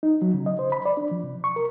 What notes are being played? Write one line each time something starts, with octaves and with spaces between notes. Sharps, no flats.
D#4
F#3
C#3
D#5
C5
B5
D5
D4
F3
C3
C#6
A#4